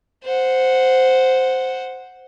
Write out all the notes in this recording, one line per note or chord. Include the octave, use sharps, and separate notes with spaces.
C5 F#5